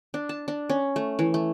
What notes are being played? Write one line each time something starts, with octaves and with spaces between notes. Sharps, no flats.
D4
A5
D4
C#4
A3
E3
A3